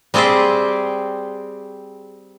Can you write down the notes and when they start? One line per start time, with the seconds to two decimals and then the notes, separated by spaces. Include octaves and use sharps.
0.14 G3 C4 G#4 C5 D5 E5